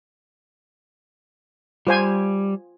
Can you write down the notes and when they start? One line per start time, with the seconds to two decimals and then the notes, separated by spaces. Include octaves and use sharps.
1.87 G3 F4 C5 G#5